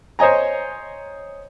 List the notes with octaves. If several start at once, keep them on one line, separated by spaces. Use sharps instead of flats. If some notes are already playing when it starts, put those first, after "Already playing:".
C5 C#5 D#5 G#5 A#5